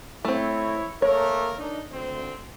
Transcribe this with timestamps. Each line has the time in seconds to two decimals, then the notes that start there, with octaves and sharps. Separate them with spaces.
0.25 A3 C4 E4 C#5
1.02 A3 A#3 A#4 C#5
1.58 D4 D#4
1.90 D2 C4